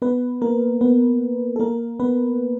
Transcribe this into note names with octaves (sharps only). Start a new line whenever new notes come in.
B3 B4
A#3 A#4
B3 B4
A4
A#3 A#4
B3 B4